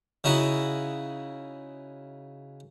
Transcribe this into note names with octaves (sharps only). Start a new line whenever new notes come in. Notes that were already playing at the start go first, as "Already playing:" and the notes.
C#3 D#4 E4 F#4